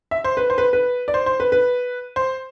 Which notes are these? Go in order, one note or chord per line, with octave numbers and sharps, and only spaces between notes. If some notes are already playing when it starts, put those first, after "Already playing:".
E5
C5
B4
C5
B4
B4
D5
C5
C5
B4
B4
C5